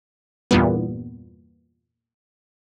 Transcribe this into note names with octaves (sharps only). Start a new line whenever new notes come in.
E2 G2 A#2 G3 B3